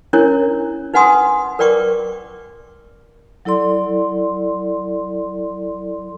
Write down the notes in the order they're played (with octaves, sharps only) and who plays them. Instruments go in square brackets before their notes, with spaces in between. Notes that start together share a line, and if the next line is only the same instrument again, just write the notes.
[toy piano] C#4 D4 E4 A#4 C#5
D#4 B4 F#5 G#5 C6 D#6
A#4 B4 D5 G5 C#6 D6
[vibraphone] F#3 E4 A4 D5 C6